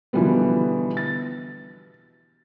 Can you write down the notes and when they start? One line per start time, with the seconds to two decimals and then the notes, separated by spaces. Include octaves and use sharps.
0.13 B2 D3 E3 F3 G3 B3
0.97 A6